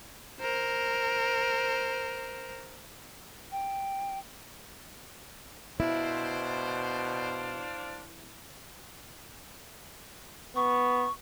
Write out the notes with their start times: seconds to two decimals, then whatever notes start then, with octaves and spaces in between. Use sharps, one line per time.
0.41 A#4 C5
3.52 G5
5.80 B2 D4 E4 C5 D5 F5
10.56 B3 C#6